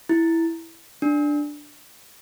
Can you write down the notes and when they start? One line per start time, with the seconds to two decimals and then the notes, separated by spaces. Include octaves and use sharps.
0.09 E4
1.02 D4